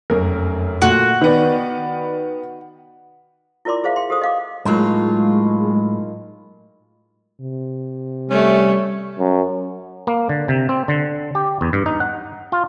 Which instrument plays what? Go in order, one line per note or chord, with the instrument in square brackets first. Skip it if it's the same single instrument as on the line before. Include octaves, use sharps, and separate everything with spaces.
[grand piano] F1 F#2 [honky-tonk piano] A#4
[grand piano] A#2 A3 [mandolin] F#4
[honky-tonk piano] D#3 B3 [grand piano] B4 D5
[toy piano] E4 F4 A#4 D5 C6 D6
G#4 C5 E5 F5
G5 C6
G4 A4 B4 C5 D#6
D#5 F5 D6
[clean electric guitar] A2 F#3 [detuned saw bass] G#3 [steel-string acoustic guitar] A#3 D#4 F4
[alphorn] C3
[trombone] G3 [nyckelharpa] A3 C#5 [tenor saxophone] C#4
[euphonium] F#2
[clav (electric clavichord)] A#3
D3
C3
C4
D3
G4
E2
G2
D#4
F#5
F4